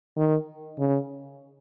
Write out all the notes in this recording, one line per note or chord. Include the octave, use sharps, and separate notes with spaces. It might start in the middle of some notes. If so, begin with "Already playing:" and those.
D#3
C#3